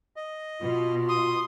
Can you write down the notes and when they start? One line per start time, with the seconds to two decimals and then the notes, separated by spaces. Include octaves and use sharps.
0.16 D#5
0.61 B2 F4
1.08 C6 D#6